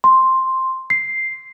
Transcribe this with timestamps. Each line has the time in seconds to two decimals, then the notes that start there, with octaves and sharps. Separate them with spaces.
0.04 C6
0.90 C7